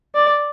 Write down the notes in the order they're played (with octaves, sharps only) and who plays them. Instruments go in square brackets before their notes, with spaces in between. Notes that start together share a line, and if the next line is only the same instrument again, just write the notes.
[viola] D5